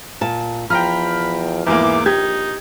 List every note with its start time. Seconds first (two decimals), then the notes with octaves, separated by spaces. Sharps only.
0.21 A#2 A5
0.70 E2 F3 G5 A#5 B5 F6
1.67 E2 G#2 E3 A#3 D6
2.06 A#1 D#4 G4 G#6